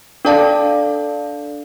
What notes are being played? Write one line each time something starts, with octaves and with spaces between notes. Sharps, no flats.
D4 A4 D5 F5 A5